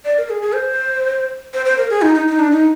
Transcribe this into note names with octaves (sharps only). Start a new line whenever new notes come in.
D5
A#4
G#4
G#4
C5
C5
C5
A#4
G#4
D#4
D#4
D#4
D4
D#4